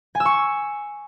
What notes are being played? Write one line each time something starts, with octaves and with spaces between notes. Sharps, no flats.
G#5
E6
C#6